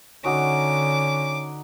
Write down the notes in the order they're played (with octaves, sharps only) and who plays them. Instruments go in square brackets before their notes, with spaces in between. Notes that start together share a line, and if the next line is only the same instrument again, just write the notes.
[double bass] D3 [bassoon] C#4 [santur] D#4 F#4 [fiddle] D6